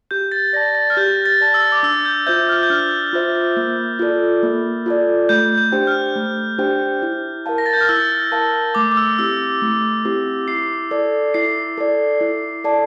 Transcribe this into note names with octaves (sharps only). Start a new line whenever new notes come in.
G4 G6
A6
D5 A5 A#6
A6
F6
G4 G6
A6
D5 A5
E6
D6
D4 E6
G6
F4 C5 E5 G6
F6
G6
D4 F6
F4 C5 E5
A#3
F4 A4 D5
A#3
F4 A4 D5
A3 G6
G6
D4 G4 C5 G5
F6
A3
D4 G4 C5 G5
E4
A#4 F5 A5
A#6
A6
G6
F6
E4 E6
A#4 F5 A5
A3 D6
D6
E6
C4 E4 G4 E6
A3
C4 E4 G4
E4 C7
A4 D5
E4 C7
A4 D5
E4
A4 D5 A5